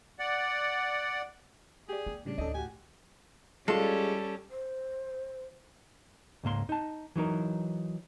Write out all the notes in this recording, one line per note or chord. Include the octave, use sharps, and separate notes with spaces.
D5 F#5
G4 G#4 D5
A#3
A2 C#3 G3 D4
A1 D2 C#4 D#4 A4 D#5
A2 F#4 G4 G#5
G3 G#3 C#4 F4 A4
C5
C#2 G#2 A#3 C6
D#4 A5
E3 F#3 D#4 A#4